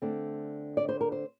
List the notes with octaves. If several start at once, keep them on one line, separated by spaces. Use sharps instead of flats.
D3 A3 C4
D5
C5
A#4
C5